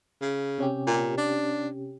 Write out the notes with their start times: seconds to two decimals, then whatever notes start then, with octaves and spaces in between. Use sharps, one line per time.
0.21 C#3
0.58 C3 C#4 G4
0.87 A#2
1.17 D4